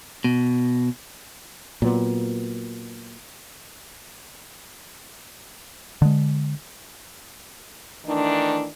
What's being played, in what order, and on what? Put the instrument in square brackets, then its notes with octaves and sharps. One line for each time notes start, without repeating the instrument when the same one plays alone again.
[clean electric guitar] B2
[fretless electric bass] A#2 F#3 B3
[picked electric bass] D3 G#3
[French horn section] D#3 E3 A3 D4